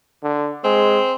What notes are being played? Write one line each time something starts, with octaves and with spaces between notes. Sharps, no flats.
D3
G#3 C4